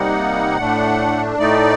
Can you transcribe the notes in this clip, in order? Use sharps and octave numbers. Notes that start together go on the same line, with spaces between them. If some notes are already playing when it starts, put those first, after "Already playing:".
Already playing: C3 G3 A#3 D#4 F#5
A2 A3 D4
A2 A3 D#4 D5